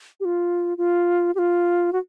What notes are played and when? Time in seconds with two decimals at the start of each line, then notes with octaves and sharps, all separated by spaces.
0.20 G4
0.25 F4
0.78 F4
1.35 G4
1.38 F4
1.93 F#4